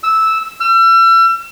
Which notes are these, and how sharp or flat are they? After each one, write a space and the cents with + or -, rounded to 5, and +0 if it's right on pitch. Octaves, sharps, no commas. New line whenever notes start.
E6 -10
E6 +40